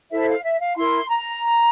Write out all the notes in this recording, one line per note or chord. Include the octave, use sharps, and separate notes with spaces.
E4 A4 C5 E5
F5
E5
F5
E4 A#4 C6
A#5